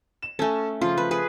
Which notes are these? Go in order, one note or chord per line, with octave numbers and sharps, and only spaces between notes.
E7
A3 C#4 A4 G#5
C#3 F3 F4
B4
G#4 B4